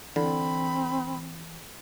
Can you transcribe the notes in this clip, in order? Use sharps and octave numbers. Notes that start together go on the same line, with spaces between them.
D3 E3 C4 B5